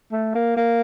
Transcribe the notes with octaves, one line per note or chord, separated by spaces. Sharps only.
A3
A#3
A#3